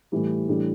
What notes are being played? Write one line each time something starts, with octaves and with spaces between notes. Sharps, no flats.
A2 E3 G3
A2 E3 G3 D4